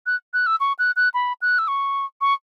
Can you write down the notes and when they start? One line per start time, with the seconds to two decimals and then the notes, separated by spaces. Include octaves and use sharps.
0.06 F#6
0.33 F#6
0.46 E6
0.60 C#6
0.79 F#6
0.96 F#6
1.14 B5
1.42 F#6
1.58 E6
1.68 C#6
2.21 C#6